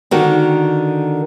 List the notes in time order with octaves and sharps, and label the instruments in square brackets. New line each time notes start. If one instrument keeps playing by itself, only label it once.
[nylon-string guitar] D3 D#3 F#4